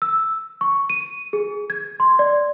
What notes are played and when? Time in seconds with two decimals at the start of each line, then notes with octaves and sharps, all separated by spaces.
0.02 E6
0.61 C#6
0.90 D#7
1.33 G#4
1.70 G#6
2.00 C6
2.19 D5